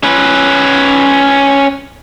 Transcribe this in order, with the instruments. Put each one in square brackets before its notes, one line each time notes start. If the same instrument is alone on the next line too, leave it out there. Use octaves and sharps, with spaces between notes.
[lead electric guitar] C#4 B4